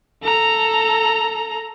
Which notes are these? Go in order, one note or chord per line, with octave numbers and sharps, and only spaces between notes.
A4 A#5